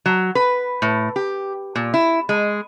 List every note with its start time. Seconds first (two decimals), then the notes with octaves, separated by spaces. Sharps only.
0.06 F#3
0.35 B4
0.82 A2
1.16 G4
1.76 A#2
1.94 E4
2.29 G#3